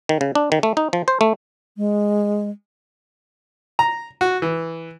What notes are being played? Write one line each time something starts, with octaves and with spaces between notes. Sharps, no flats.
D#3
C#3
D4
D#3
A3
D#4
F3
C5
A3
G#3
A#5
F#4
E3